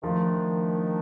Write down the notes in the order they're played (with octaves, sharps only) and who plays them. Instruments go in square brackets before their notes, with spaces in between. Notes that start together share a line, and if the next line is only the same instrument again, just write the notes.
[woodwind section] D#3 A3 D4 [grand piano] F3